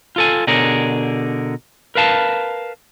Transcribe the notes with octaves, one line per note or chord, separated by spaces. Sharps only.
F4 A4 G#5
B2 D3 G#4 A#4 C#5
A#4 B4 F5 A5